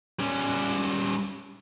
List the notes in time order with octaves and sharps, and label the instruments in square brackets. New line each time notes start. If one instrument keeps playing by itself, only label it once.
[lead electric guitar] G3 C#4